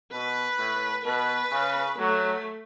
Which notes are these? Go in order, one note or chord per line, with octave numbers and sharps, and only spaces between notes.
B2 B4
A2
B2 B4
C#3
F#3 A3